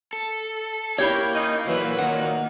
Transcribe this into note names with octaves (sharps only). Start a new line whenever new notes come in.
A4
A#3 E4 G4 C#5
D#3 C#4 D#4
A#2 E3 F#3 B4
D#3 F#5